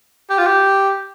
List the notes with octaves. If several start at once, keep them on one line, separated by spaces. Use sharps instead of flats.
G4
F4
G4